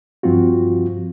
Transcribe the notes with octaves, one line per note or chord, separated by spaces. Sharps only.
G2 F3 C4 F4 F#4